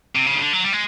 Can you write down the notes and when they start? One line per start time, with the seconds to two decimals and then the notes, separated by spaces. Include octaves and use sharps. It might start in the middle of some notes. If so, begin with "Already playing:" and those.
0.15 C3
0.26 C#3
0.35 D#3
0.40 D3
0.53 F#3
0.63 G3
0.73 G#3